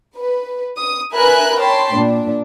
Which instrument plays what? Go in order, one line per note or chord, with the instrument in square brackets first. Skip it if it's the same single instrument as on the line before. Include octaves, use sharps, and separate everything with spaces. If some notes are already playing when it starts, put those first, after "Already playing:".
[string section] B4
D#6
A#4 B4 E5 G#5 B5 F#6
C#5 G5 A5 B5 C6
A#2 D4